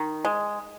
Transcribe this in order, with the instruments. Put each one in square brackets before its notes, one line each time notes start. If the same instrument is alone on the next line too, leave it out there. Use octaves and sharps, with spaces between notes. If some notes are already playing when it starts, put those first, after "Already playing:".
Already playing: [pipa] D#3
G#3